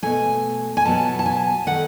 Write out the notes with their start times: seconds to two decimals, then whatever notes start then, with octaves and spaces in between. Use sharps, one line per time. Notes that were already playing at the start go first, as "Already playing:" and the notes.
0.03 B2 A3 G#5
0.77 G#5
0.85 B2 F#3 B3 A5
1.19 A5
1.26 G#5
1.67 D#3 A3 F#5